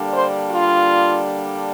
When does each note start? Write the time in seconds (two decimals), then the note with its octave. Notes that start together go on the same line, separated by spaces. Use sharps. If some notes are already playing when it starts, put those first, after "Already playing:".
Already playing: D3 G3 A#3 D4
0.13 C5
0.51 F4